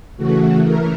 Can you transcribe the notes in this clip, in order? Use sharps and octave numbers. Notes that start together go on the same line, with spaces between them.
C#3 E3 A3 F#4
A#4